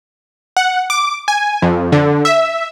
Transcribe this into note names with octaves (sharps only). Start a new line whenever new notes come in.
F#5
D6
G#5
F2
D3
E5